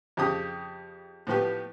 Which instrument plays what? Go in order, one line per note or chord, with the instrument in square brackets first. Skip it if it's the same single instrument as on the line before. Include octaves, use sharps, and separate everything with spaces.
[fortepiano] F2 C#3 G4 D#6
A2 F3 B3 G4